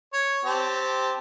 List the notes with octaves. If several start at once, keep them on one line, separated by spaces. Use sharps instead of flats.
C#5
C4 G4 A5